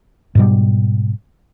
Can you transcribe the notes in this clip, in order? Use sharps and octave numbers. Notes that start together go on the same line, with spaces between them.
G#2 B2 G3